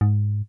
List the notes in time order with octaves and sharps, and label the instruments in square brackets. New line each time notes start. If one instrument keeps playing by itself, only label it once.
[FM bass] G#2